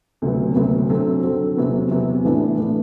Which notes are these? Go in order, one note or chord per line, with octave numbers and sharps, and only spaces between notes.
D2 C3 F#3 B3
D2 C3 F#3 B3
D3 F#3 C4
D3 F#3 C4
E2 C3 F#3 B3
E2 C3 F#3 B3
A2 E3 B3 D4
A2 E3 B3 D4